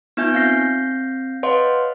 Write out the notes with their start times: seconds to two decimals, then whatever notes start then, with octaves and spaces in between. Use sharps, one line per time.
0.17 B3 D#4 F4 E5 G#5 G6
0.34 C4 F5 G6 A#6 C7
1.43 B4 C#5 D#5 F5 F#5 C6